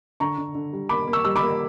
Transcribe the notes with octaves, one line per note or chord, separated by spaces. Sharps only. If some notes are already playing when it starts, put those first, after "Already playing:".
D3 A#5 C#6
D3
D3
G3
A#3 B5 D6
A#3
C#6 E6
G3 E6
B5 D6
A#3